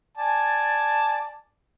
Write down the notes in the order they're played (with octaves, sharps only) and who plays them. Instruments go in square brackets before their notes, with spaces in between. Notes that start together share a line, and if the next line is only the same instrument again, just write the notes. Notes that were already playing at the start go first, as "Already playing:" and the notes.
[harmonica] D5 G#5 A5